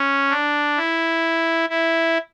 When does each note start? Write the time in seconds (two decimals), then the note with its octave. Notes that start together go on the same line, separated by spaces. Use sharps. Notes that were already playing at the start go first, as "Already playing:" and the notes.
Already playing: C#4
0.30 D4
0.77 E4
1.69 E4